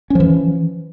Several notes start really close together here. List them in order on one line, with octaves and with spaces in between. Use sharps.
C#4 F3 E3